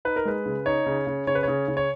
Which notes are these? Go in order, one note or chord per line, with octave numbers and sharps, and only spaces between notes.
D#4 B4
A#4
G#3 B4
C#3
D#4 C#5
C#3
C#3
C#3 C#5
B4
C#3 C#5
C#3
C#5